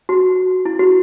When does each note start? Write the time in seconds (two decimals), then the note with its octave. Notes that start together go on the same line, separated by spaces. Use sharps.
0.09 F#4
0.65 E4
0.79 F#4